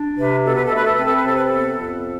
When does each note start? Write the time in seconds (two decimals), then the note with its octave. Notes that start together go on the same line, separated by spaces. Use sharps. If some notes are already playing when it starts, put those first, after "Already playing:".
Already playing: D4
0.18 C3 B4
0.45 B2 A4
0.55 B4
0.66 A4
0.72 A3 B4
0.86 A4
0.96 C4 B4
1.06 A4
1.16 B4
1.25 C3 A4
1.37 B4
1.46 A4
1.52 B3
1.79 F2